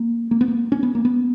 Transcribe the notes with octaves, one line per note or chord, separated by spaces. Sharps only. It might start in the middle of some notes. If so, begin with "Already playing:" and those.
Already playing: A#3
A#3
B3
A#3
C#4
B3
A#3
B3